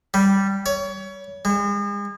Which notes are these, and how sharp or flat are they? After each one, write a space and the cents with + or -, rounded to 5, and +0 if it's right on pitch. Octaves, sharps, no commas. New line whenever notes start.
G3 -5
C#5 +25
G#3 -40